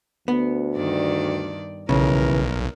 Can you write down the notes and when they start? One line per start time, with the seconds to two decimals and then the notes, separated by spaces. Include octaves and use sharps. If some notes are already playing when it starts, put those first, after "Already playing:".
0.28 D2 B3
0.75 G2 D#3 D5
1.89 B1 C#3 E3 A#4